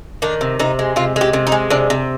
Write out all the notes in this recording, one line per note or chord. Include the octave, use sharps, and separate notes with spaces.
D#3 D4
C3
C3 D#4
G#3
C3 F4
G#3 G4
C3
D#4
G#3
C3 D4
C3